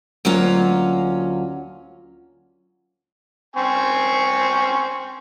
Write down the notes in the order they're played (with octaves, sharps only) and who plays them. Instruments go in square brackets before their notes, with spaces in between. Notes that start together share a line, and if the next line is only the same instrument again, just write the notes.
[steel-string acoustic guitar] D2 F#3 A#3 C#4 F4 F#5
[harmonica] C4 G#5 C#6